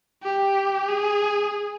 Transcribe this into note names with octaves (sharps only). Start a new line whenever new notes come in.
G4
G#4